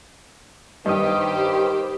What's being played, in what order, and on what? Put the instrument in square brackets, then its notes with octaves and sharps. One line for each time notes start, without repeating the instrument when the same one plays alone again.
[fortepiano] G2 [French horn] D#3 [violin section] G4 B4 C5 [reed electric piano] D#5 D#6